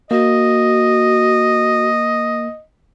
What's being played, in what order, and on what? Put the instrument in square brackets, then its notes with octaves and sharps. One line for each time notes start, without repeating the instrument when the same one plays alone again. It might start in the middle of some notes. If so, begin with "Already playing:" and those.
[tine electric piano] A#3 [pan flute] F#4 [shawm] D#5